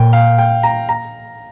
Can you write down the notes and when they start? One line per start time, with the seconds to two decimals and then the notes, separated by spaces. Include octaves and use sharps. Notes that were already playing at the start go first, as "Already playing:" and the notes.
Already playing: A#2 G5
0.13 F5
0.38 G5
0.63 A#5
0.89 A#5